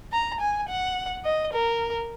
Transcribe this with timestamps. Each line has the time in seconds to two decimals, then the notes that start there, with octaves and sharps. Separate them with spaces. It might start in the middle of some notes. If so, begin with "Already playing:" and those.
0.12 A#5
0.41 G#5
0.69 F#5
1.25 D#5
1.54 A#4